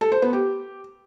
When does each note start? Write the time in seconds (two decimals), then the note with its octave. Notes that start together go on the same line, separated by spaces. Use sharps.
0.01 A4
0.12 C5
0.22 B3
0.33 G4